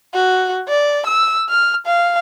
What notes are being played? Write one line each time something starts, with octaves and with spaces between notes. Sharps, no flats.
F#4
D5
E6
F6
F5